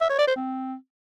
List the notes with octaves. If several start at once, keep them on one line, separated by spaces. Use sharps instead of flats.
E5
C#5
D5
C5
C4